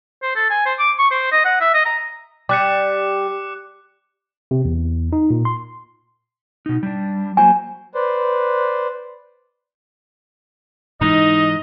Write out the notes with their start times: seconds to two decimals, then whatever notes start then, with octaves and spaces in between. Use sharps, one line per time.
0.22 C5
0.36 A4
0.50 G#5
0.65 C5
0.79 D6
0.98 C#6
1.11 C5
1.32 D#5
1.45 F#5
1.61 E5
1.74 D#5
1.86 A#5
2.49 G3 D6 F#6 C#7
4.51 C3
4.65 E2
5.13 D#4
5.30 A#2
5.45 C6
6.66 B2 D#4
6.83 G3 D4
7.37 F#3 A#3 C5 G#5
7.95 B4 C5 D5
11.01 G#2 E3 D#4 D#5